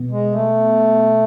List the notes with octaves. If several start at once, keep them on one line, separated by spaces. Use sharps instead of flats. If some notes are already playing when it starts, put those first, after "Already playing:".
Already playing: B2 B3
G#3
A3